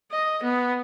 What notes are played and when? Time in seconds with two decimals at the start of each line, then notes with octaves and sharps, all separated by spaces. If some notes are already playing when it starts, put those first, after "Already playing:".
0.11 D#5
0.43 B3